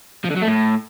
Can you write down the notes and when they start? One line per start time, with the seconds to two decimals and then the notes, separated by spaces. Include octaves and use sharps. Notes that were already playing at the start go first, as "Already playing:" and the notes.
0.25 F3
0.31 D3
0.37 F#3
0.42 A3
0.48 A2